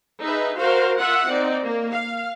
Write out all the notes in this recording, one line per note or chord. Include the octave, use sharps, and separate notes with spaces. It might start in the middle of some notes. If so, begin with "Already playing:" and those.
D#4 G#4 B4 E5
F#4 A#4 C5 F5
F4 E5 F#5
C4 D#4 D5
A#3
F5